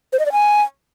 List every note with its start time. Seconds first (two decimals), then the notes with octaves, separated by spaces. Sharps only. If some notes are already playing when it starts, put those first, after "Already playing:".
0.13 C5
0.19 D#5
0.26 D5
0.32 G#5